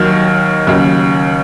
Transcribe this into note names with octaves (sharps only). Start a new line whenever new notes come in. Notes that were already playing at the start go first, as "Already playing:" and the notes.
Already playing: D#2 D#3 F#3 F6
D#2 C#3 F#3